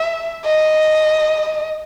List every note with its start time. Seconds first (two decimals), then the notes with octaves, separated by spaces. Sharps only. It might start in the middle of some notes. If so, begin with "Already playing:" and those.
Already playing: E5
0.45 D#5